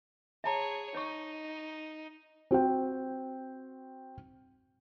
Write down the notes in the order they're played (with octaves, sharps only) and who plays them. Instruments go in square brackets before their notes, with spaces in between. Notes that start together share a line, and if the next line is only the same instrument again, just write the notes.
[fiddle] G#4 C#5 [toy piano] E5 A5 A#5
[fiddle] D#4 [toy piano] C#5 C#6
[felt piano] C4 F#4 C5 G5